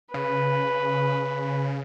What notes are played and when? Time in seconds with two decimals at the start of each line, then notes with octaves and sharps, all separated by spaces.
0.14 C#3 B4